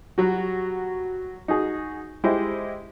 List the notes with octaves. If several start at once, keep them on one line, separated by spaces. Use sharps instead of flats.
F#3 G3 F#4
D#4 F#4 G#4
G#3 E4 G4 C5 D#5